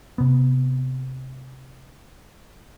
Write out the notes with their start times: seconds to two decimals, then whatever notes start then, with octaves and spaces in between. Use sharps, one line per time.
0.18 C3 B3